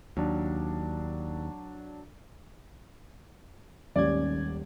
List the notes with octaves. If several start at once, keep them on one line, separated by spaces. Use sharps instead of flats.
D#2 F#3 D4
D#1 G#1 D#3 C#4 G4 D5 G#6